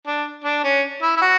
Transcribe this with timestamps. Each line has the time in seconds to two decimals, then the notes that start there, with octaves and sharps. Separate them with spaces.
0.07 D4
0.45 D4
0.64 C#4
1.02 E4
1.17 E4
1.22 F#4